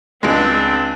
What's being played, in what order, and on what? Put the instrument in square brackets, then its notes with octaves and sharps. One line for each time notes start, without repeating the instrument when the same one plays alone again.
[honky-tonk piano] C#2 G#3 [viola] C4 D4